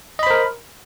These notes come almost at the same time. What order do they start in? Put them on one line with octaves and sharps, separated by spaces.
D#5 B5 C5 A#4